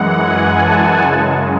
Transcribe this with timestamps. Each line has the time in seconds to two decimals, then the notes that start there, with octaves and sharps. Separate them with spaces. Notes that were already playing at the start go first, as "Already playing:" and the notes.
Already playing: F#2 E3 G#3 F#5
0.24 G#5
0.62 A5
1.02 F#2 C#3 G#3